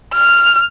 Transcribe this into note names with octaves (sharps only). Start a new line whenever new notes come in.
F6